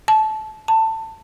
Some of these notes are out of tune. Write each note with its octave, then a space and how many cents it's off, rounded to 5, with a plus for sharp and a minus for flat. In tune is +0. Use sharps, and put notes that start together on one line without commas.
A5 -20
A5 +20